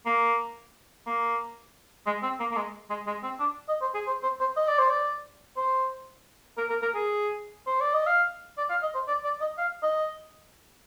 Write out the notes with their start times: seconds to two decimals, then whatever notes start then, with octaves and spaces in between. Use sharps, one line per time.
0.06 A#3
1.07 A#3
2.06 G#3
2.23 C4
2.40 A#3
2.51 A#3
2.56 G#3
2.90 G#3
3.07 G#3
3.23 C4
3.40 D4
3.69 D#5
3.81 C5
3.94 G#4
4.07 C5
4.23 C5
4.40 C5
4.57 D#5
4.68 D5
4.79 C5
4.90 D5
5.57 C5
6.58 A#4
6.70 A#4
6.82 A#4
6.95 G#4
7.66 C5
7.81 D5
7.94 D#5
8.07 F5
8.58 D5
8.70 F5
8.83 D#5
8.95 C5
9.08 D5
9.24 D5
9.41 D#5
9.58 F5
9.83 D#5